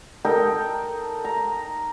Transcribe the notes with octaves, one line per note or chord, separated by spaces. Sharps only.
D#4 A4 A#4 G5
A#5